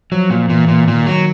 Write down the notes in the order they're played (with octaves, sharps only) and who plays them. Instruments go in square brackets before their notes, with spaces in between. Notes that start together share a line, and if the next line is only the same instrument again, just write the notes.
[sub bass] F3 [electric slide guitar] F#3
[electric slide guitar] A#2
[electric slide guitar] A#2 [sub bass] E3
[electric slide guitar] A#2
[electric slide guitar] A#2 [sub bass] D#3
[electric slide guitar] F#3